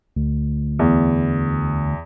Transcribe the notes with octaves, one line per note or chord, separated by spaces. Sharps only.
D2
E2